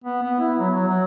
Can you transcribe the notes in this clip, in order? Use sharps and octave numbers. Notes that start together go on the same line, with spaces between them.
B3
B3
E4
F#3
F#3
F#3